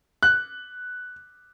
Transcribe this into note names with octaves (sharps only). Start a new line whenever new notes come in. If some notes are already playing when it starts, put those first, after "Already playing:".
F#6